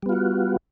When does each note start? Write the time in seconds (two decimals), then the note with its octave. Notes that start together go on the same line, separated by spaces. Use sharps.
0.03 G3
0.06 B3
0.09 F4
0.13 F#4